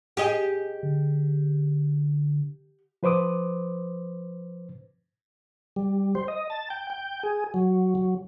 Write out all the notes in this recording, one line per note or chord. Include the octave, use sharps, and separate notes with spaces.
G4 G#4 D#5
D3
F3 B4 C5 D6 D#6
G3
C5
D#5
A5
G5
G5
G#4
F#3
F#3